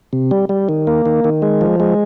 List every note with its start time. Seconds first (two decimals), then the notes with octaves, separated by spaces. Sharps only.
0.13 C3
0.31 G3
0.49 G3
0.69 D#3
0.87 A#3
1.06 D#3
1.24 D#3
1.42 G#3
1.61 F3
1.80 G#3